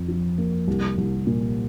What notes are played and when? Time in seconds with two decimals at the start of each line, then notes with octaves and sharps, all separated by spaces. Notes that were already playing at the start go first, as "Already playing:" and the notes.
Already playing: F2
0.08 F3
0.38 A#3
0.67 C2
0.97 C2
1.27 A#2